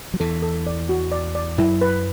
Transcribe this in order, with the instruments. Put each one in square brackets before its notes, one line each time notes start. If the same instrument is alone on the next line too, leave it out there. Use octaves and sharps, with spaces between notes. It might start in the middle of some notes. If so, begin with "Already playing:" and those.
[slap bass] F#3
[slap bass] E2 E3 [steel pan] A4
[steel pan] A4
D5
F#4
D5
D5
[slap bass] F#2 F#3 [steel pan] E4
[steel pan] B4